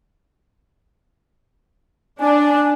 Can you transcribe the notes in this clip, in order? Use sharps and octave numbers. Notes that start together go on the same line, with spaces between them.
D4 G#5